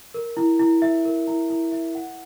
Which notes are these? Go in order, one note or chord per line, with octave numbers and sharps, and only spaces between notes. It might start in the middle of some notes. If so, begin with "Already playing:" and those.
A#4
E4
E4
E5
A#4
E4
E4
E5
F#5